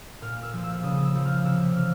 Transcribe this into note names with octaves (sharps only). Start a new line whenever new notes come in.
A#2 F6
E6
F3
E6
C#3 D#6
E6
F3
F6
C3 E6
E3 F6